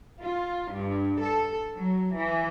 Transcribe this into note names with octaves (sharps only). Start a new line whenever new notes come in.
F4
G2
A4
F#3
E3